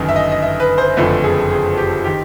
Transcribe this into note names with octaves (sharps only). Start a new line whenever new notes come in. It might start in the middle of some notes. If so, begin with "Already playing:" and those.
Already playing: G1 F#2 D#3
E5
D#5
D#5
E5
B4
C5
F#1 F2 D3 F3 A3 B4
G#4
G#4
G4
D#3 G4